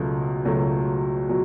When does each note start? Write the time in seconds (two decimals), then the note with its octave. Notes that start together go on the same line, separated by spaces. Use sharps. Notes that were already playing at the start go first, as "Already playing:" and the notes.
Already playing: C#2 B2 F#3 A3
0.45 C#2 B2 F#3 A3
1.29 B2 F#3